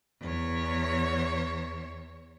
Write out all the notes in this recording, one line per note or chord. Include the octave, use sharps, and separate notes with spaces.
E2 C#5